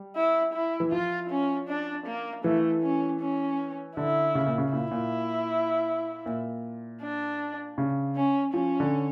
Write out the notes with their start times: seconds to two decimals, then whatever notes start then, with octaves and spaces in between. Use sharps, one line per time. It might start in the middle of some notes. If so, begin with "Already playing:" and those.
Already playing: G3
0.16 E4
0.54 E4
0.80 E3
0.92 F3 F4
1.30 C#4
1.68 D4
2.06 A#3
2.44 E3 A3
2.83 C#4
3.20 C#4
3.96 D3 E4
4.35 C#3
4.46 A#2
4.58 C#3
4.73 A#2 E4
4.91 A#2
6.26 A#2
7.02 D4
7.78 C#3
8.16 C#4
8.54 F3 C#4
8.80 D3